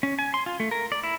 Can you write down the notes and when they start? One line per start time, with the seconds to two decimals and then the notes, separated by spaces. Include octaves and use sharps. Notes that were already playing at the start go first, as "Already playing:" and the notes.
0.03 C#4
0.19 G#5
0.34 C6
0.46 F4
0.60 A3
0.71 A#4
0.92 D5
1.03 E4